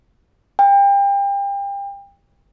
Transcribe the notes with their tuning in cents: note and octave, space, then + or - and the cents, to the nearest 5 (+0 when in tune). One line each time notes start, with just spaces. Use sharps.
G5 +30